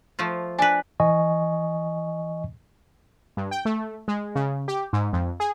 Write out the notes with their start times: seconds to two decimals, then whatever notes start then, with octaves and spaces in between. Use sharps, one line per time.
0.19 F3 A3 F4
0.59 D4 B4 G#5
1.00 E3 D#5 G#5 C#6
3.37 G2
3.51 G5
3.65 A3
4.08 G#3
4.35 C#3
4.68 G4
4.93 G#2
5.13 F2
5.40 G#4